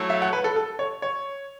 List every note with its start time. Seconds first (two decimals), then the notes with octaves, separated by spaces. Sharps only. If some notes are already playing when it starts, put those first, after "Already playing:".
Already playing: F#3 A3 E4 A4 C#5
0.10 E5
0.22 F#5
0.33 B4
0.44 A4
0.56 A4
0.79 C#5
1.02 C#5